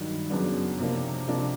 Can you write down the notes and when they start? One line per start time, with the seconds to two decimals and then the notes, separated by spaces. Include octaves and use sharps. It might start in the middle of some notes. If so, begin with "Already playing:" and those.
Already playing: G2 D#3 F#3
0.30 F#2 C#3 F#3 B3 D4
0.79 C3 F3 A#3 D4
1.28 C3 F3 A#3 D4